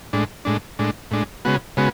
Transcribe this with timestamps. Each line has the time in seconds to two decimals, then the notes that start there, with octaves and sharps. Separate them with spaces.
0.13 A2 G#3 D4
0.45 A2 G#3 D4
0.79 A2 G#3 D4
1.11 A2 G#3 D4
1.45 C#3 G#3 B3 F#4
1.77 C#3 G#3 B3 F#4